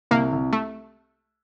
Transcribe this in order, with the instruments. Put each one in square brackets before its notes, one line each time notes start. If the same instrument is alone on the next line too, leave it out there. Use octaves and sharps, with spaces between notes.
[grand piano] C2 [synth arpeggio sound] A#3
[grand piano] C2
[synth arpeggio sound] A3